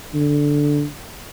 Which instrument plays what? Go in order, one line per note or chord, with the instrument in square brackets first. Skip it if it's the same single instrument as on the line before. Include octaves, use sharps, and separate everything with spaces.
[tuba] D3